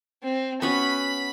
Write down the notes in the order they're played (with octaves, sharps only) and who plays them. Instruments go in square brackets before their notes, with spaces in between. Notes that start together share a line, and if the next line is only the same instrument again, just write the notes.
[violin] C4
[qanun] B3 C#4 F#4 [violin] B5